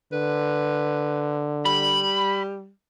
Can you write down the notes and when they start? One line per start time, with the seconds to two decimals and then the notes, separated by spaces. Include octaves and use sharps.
0.13 D3 B4
1.65 G3 B5